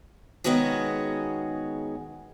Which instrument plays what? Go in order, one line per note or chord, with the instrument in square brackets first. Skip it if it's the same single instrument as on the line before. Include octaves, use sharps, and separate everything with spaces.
[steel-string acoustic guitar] D#3 G#3 B3 C#4 F#4 G#4